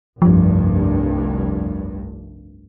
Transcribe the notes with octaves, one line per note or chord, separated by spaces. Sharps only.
F1 C2 G2 F3